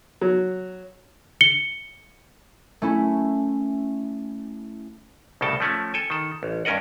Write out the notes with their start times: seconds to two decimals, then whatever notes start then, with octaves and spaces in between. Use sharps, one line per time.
0.21 F#3
1.41 C#7 G7
2.82 A3 C#4 E4
5.41 C2 A2 C#3 A4 G5 A5
5.60 F3 A3 C#4
5.94 A4 G5 G#5
6.10 D#3 A4
6.43 A1
6.65 G2 C#4 A#4 D#5 F#5